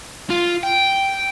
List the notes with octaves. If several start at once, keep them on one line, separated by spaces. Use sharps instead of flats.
F4
G5